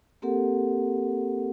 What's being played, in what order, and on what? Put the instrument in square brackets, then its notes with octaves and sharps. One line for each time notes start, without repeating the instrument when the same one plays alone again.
[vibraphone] A#3 C4 G4 A4 A#4 F#5